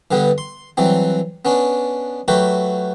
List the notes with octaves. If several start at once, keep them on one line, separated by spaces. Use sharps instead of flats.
G2 D3 G3 B3
C6
E3 F#3 G3 C4
B3 C#4 D4
F#3 A3 F#4 G4 B4